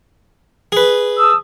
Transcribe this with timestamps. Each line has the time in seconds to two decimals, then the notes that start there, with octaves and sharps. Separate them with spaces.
0.72 G#4 B4
1.18 A5 D#6 E6